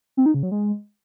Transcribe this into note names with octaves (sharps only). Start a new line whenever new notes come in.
C4
D#4
C#3
F#3
G#3